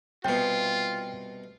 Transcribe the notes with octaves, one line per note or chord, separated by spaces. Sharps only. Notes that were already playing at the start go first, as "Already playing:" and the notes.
C2 B2 F4 G5